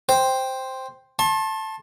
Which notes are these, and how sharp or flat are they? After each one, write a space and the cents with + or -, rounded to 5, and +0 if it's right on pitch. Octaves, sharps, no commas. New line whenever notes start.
C5 +0 G5 +5
A5 +0 C6 +40